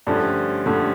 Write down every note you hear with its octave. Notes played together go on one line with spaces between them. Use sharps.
G2 D3 F3 A3 C#4
G2 D3 F3 A3 C#4